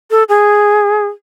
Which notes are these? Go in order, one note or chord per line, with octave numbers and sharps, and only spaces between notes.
A4
G#4